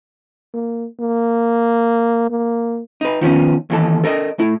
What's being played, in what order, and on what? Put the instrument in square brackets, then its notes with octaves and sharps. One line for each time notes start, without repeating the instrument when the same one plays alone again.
[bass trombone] A#3
A#3
A#3
[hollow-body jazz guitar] D#4 B4
D#3 F3 B3 C#4
D#2 E3 A4
A4 A#4 C#5 D#5
A2 E4